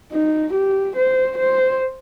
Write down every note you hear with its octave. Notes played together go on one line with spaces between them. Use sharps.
D#4
G4
C5
C5